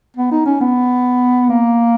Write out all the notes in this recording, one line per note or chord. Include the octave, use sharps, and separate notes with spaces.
B3
D#4
C#4
B3
A#3